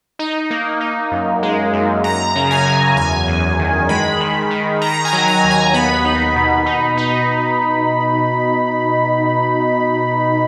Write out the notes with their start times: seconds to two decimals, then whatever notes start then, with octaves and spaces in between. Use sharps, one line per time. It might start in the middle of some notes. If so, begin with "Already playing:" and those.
0.19 D#4
0.51 A#3
0.81 D#4
1.12 F#2
1.43 G#3
1.73 F#2
2.04 F#2 A#5
2.35 C#3
2.51 G#5
2.66 F#2
2.96 E2 G#5
3.28 E2
3.59 D#3
3.89 G#3 B5
4.20 D#3
4.51 D#3
4.81 D#3 A#5
5.05 G#5
5.13 F#3
5.28 G#5
5.44 D#2
5.51 A#5
5.74 B3 B5
6.05 D#4
6.36 B2
6.66 D#4
6.97 D#4